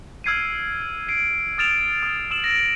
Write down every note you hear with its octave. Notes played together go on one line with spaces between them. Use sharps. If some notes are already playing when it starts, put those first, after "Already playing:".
E6 F6 G#6 C7 D7 D#7
C7 D7
D#6 F6 A6 D7 E7 F7
D#6
E6 E7 F#7
A#6 D7